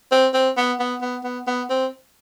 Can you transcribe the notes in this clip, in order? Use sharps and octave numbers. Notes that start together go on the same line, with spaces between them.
C4
C4
B3
B3
B3
B3
B3
C4